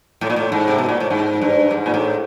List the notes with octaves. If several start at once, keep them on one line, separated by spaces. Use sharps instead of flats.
A2
A#2
A2
G#2
C3
B2
A#2
A2
G#2
G2
G#2
A#2
A2